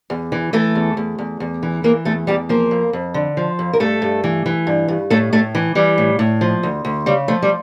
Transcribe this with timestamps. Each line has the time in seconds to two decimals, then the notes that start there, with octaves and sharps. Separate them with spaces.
0.10 E2
0.32 E3
0.53 E3 A3 A4
0.75 E2
0.97 E2
1.18 E2
1.40 E2
1.63 E3
1.84 E3 A#3 A#4
2.05 E2 A3 A4
2.27 E2 G3 G4
2.49 F3 A#3 A#4
2.71 F2
2.93 F2
3.14 D3
3.37 F3
3.59 F2
3.73 A#4
3.80 G2 A3 A4
4.02 G2
4.24 E3
4.46 E3
4.67 G2
4.88 G2
5.10 A2 A3 A4
5.33 A2 A3 A4
5.55 E3
5.75 E3 G3
5.98 A2
6.19 A2
6.41 F3
6.63 D2
6.85 D2
7.06 C#3 G3
7.28 F3 A3
7.42 G3